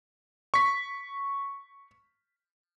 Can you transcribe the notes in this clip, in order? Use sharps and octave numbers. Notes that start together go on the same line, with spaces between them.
C#6 B6